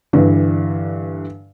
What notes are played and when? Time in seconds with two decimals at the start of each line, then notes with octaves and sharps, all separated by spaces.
0.13 G2 D3 E3